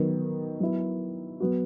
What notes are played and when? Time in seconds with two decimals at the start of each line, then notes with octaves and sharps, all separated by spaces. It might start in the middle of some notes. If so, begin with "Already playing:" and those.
Already playing: D#3 F#3 B3
0.60 F#3 B3 E4
1.40 F#3 B3 F#4